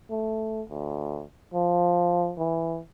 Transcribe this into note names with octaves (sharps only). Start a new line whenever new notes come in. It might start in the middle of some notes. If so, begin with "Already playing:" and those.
A3
D2
F3
E3